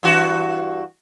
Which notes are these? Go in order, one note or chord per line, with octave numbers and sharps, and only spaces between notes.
G2 E3 F#4